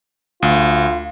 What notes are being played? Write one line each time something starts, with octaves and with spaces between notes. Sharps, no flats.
D2 F4